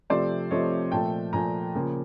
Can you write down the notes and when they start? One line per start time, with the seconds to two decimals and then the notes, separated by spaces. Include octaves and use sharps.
0.10 C3 F3 A3 C4 C5 D5
0.51 C3 F3 A3 C4 C#5 D#5
0.92 A#2 F3 A3 G5 A5
1.33 A#2 F3 A3 G#5 A#5
1.75 C#3 F3 A#3